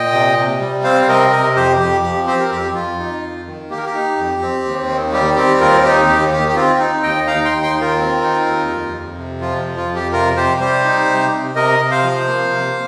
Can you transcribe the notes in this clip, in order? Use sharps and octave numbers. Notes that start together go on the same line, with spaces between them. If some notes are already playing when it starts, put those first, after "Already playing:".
Already playing: A#2 D#5 G5
C3
C3
G3
C4 C5 F5
F5
C3 A#4 D#5
C3 A#4 D#5
F2 G4 C5
F2 G4
F3 G4
C4 G4 C5
A#4
F2 G4
F2 F4
D#4
F2
D#3
A#3 G4
A#4
G4
D#4
F2
C4
D#2
D#3
G3 G4
C4 G4
D#2 F4 A#4
D#4 G4
D#2 G4
D#3 G4
G4
C4 F4
D#4
D#2 D#5 G5
D#4 F5 A#5
G5 C6
D#2
G5 C6
D#3
F4 A#4
C4
D#4
D#2
F2
F2
C3
F3 F4
F2
F4
F2
G4
C3 F4 A#4
C3 G4 C5
G3 G4 C5
D#4
C3
C3
C3 A#4 D#5
C3
C5 F5
F3
A#3
C3